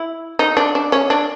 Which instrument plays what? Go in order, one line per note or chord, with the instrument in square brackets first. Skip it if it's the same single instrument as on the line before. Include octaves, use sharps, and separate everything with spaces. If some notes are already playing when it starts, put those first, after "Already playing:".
Already playing: [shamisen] E4
D#4
D4
D4
C#4
D4